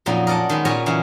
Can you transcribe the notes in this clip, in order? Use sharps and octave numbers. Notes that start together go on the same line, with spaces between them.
F2 A#2 F#3 A#3 C#4 D#4
A#4 D5 D#5 F#5 A5
D#3 G#3 B3
A#2 C#4 A#4 C#5 G#5 A#5
C#3 E3 F#3 C#4